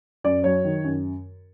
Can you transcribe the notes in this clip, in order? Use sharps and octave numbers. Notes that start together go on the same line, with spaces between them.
F#2 D5
F#3 C#5
D#3
F#2